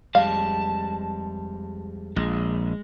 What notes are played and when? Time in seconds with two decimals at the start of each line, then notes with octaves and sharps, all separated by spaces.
0.15 F2 G3 G#3 F5 A5
2.16 A#1 G#3